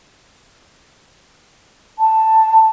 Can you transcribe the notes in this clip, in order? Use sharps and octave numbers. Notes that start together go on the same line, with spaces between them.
A5